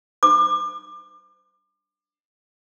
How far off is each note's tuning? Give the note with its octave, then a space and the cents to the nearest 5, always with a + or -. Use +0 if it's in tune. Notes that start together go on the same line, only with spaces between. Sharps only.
D6 +35